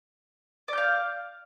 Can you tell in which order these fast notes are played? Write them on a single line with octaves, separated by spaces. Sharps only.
D5 G6 F5